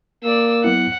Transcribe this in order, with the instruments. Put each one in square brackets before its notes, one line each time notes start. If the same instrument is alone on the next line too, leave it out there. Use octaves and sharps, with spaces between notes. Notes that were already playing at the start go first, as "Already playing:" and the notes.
[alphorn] A#3 [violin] D5 E6
[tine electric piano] F#3 B3 E4 [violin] F#5